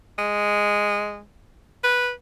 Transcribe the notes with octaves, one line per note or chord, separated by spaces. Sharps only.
G#3
B4